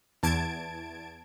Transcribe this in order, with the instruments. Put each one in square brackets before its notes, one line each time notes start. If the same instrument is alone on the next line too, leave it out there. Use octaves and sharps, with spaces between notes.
[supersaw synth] E2 A5 G#6 D7